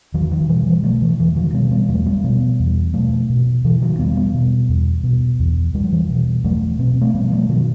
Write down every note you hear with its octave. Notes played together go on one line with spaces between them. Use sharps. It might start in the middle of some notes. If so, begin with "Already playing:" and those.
E2 D#3 F#3
D#3 F#3
B2 E3 G3
E3 G3
B2 F#3 A3
E3
E2 E3
D#3 F#3
B2 G3 B3
G3 B3
E2 F#3 A3
G3 B3
B2 G3 B3
E2
B2 F#3 A3
B2
B2 E3
D#3 F#3
E2 G3 B3
G3 B3
B2
E2
B2
E2
E2 G3
F#3
E3 G3
B2
E2 F#3 A3
B2 C4
A3 C4
B2 G3 B3
F#3 A3
B2 D#3 F#3